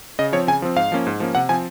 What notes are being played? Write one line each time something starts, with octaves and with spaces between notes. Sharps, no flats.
C#3 D#5
F3 C4 C#5
C#3 G#5
F3 C4
G#2 F5
F3 A#3 C#4
G#2
F3 A#3 C#4
C3 F#5
F3 C4 G#5